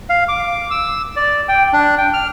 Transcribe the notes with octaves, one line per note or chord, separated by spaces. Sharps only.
F5
D6
E6
D5
G5
D4
G5
F6